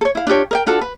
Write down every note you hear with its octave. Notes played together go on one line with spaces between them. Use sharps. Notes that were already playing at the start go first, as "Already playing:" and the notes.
A4 C#5
E4 F5
D4 F4 G4 C#5
A#4 D#5 G5
D4 F4 F#4 A4
B4